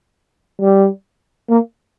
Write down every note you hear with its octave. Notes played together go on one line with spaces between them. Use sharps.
G3
A#3